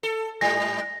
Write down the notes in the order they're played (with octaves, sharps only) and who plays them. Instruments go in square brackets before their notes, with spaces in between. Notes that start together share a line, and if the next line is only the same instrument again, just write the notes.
[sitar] A4
[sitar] G#2 G3 [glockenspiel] A#6